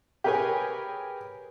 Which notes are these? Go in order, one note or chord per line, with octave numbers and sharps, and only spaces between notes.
G4 G#4 A#4 B4 C#5 G#5